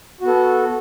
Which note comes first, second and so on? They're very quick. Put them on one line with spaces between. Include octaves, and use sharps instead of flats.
F#4 B3 A4